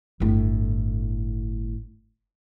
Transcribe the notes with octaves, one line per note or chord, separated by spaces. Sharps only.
G1 A2